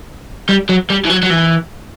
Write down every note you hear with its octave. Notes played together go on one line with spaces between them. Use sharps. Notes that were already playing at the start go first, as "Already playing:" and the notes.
G3
F#3
G3
E3
F#3
F#3
E3